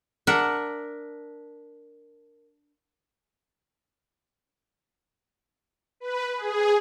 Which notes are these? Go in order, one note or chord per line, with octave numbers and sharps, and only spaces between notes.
D4 A#4 E5 F#5
B4
G#4